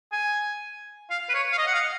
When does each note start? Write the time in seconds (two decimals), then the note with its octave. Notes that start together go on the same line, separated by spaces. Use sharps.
0.12 G#5
1.10 F5
1.29 B4
1.34 C#5
1.52 F5
1.58 D#5
1.67 F#5
1.74 F5